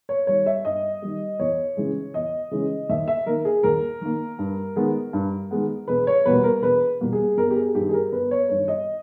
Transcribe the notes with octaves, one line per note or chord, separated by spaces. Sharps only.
C#5
D#3 G3 C#5
E5
G2 D#5
D#3 G3
E2 C#5
C#3 E3 G#3
E2 D#5
C#3 E3 G#3
D#2 E5
E5
D#3 A#3 A#4
G#4
D#2 A#4
D#3 A#3
G2
D#3 G#3 B3
G2
D#3 G#3 B3
E1 B4
C#5
E2 B2 G3 A#3 B4
A#4
E1 B4
E2 B2 G3 A#3
G#4
G1 A#4
G4
G#4
G2 D#3 G4
G#4
A#4
G1 B4
C#5
G2 D#3 C#5
D#5